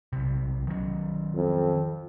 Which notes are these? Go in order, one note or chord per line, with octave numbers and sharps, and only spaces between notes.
B1 C3
D#3 F#3 C#4
F2